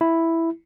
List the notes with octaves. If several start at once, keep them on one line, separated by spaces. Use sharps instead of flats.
E4